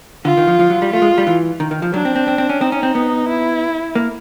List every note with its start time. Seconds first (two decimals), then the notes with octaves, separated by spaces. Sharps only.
0.25 D3 F4
0.37 D#3
0.47 F3
0.59 F3
0.70 F#3
0.82 G3
0.93 A3 F4
1.02 G#3
1.18 G3
1.27 E3
1.60 D#3
1.71 D#3
1.82 F3
1.93 F#3 D4
2.05 C4
2.15 C4
2.28 C4
2.38 C4
2.49 C#4
2.61 C4 D#4
2.72 C#4
2.83 C4
2.95 B3
3.28 E4
3.95 A#3